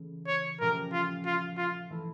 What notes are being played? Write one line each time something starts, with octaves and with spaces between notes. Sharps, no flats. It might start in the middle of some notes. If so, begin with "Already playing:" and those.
Already playing: C#3 E3 A3
C#5
A#2 F3 A3 C#4 G4 A#4
F4
F4
F4
E3 A3 E4 A4